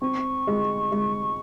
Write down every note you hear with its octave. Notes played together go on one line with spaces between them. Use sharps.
C4 C#6
G#3
G#3